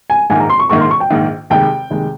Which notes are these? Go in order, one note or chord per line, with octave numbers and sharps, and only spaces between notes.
G#5
A#1 G#2 D#3 A#3 G#5
A#5
C6
C#6
A#1 G#2 D#3 A#3 C#6
C6
C#6
G5
A#1 G#2 D#3 A#3
F1 D#2 D#3 G#3 G5
F1 D#2 D#3 G#3